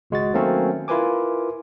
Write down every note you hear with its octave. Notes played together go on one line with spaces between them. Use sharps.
G#1 C#2 G#3 F#4 D#5 A6
D#3 F#3 A3 A#3 C4 C#4
E4 F4 A#4 B4 G#5 D6